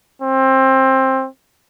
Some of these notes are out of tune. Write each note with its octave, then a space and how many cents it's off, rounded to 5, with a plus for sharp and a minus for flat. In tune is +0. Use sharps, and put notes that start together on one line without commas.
C4 +20